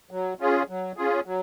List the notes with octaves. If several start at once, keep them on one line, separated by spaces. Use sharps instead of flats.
F#3
C#4 F4 G#4
F#3
C#4 F4 G#4
F#3